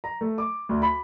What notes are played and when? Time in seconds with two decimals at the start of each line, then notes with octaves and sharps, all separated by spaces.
0.04 A#5
0.21 A3
0.38 D6
0.69 D2
0.82 B5